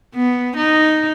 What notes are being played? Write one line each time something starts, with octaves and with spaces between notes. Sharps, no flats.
B3
D#4